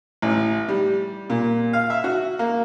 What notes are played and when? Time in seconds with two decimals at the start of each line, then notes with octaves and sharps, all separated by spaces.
0.22 A1
0.68 G3
1.30 A#2
1.73 F5
1.90 E5
2.04 F#4
2.39 A#3